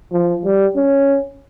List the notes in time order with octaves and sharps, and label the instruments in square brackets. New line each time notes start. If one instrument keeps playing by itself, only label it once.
[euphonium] F3
G3
C#4